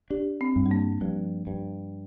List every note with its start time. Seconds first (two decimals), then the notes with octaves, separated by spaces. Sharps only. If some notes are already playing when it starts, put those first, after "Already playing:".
0.10 D4 G4
0.41 C4
0.56 G2
0.66 G3
0.71 A#3
1.01 G2 F3
1.47 G2